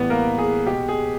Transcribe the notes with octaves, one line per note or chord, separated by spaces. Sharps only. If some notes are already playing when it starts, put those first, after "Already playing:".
Already playing: A2 E3 G3 B3 B4
A#3 A#4
G#4
B2 G#3 G4
G#4